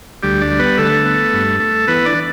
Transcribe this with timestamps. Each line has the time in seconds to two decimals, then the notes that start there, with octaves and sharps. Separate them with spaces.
0.23 D2 G3 G4
0.41 D4 D5
0.51 G3
0.59 B3 B4
0.77 D3 A3 A4
1.05 B3
1.33 G2
1.60 A3
1.87 E3 B3 B4
2.05 D4 D5